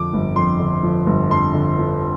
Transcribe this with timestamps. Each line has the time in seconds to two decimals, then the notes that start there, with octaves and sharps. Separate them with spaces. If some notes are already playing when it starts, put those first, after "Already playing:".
Already playing: F2 D3 F3 D6
0.13 G1
0.36 F2 C6
0.59 D3
0.83 F3
1.06 G1
1.30 F2 C6
1.54 D3
1.78 F3